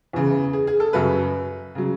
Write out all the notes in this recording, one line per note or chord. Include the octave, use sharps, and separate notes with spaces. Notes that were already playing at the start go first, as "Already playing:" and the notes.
E2 C#3 E3
G#4
G#4
A4
F#2 C#3 F#3 B4
C#3 F#3